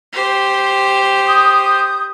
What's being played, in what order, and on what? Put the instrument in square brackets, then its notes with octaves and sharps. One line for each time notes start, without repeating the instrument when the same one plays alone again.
[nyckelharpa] G4 C5
[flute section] D#6 G6